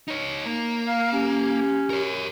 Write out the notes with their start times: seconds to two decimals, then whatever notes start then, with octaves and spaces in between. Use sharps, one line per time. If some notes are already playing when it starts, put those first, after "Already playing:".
0.08 D#4 C#5
0.46 A#3
0.86 F5
1.13 C#4 G4
1.90 A#4 C#5